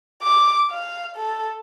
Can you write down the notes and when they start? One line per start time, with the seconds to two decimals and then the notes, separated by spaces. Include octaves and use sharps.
0.22 D6
0.71 F5
1.17 A4